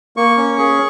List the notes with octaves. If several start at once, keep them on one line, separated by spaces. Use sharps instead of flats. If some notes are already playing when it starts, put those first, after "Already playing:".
A#3 C#6
C#4
G#4